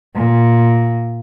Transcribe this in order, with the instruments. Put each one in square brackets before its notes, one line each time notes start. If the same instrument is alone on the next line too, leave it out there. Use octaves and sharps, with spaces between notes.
[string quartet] A#2